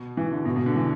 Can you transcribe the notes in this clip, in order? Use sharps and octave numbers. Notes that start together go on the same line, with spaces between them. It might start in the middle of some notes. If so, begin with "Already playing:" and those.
Already playing: B2
E3
D3
B2
B2
D3
E3